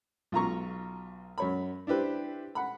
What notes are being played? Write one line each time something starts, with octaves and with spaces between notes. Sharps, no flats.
B1 F4 A#5 C#6
F#2 C#5 B5
D4 E4 G4 B4 C5
F#5 B5